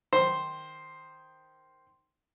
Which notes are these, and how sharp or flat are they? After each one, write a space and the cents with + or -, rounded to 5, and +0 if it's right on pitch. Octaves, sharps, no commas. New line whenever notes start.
D#3 +0 C5 +0